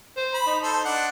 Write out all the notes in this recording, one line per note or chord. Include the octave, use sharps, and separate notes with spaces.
C5
B5
D#4
A4 C5
D4 F#5